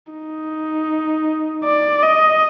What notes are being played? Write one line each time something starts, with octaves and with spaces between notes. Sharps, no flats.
D#4
D5
D#5